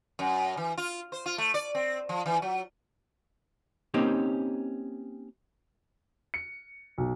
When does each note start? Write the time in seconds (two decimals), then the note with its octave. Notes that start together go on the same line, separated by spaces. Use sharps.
0.19 F#2
0.57 E3
0.78 F4
1.12 C5
1.26 F4
1.38 A3
1.54 D5
1.75 C4
2.09 F3
2.26 E3
2.42 F#3
3.94 A#3 C4 C#4 D#4 G4
6.34 C#7
6.98 B1